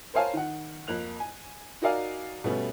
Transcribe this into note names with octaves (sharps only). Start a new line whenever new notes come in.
A#4 C5 C#5 F5 G#5 A5
D#3 F#5
F2 A#3 F#6 F7
G#5
D#4 F#4 A#4 D5 F5 G#5
B2 G3 A3 B3 C#4